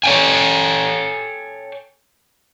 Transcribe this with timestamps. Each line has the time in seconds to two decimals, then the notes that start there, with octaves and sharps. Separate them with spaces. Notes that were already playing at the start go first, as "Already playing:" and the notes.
0.04 A4 C#5 D#5 G5 G#5